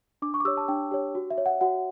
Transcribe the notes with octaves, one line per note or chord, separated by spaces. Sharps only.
D4 D6
C#6
D6
G4 C#5 E6
A5
D4 G5
G4 C#5
F#4
E5
C#5
F#5
F#4 F#5